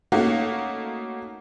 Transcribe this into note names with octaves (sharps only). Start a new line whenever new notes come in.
A3 A#3 C#4 D#4 F#4 F5